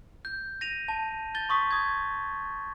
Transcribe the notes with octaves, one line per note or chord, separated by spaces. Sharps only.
G6
A#6 D#7 F7
A5
G6 A6 G7
C6 C#6 D#6 B6
D#6 G#6